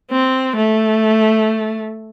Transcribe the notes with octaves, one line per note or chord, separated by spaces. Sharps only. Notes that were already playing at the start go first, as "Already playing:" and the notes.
C4
A3